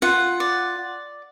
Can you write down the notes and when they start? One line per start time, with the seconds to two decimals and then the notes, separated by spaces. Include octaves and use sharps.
0.02 F4 F#5
0.40 D5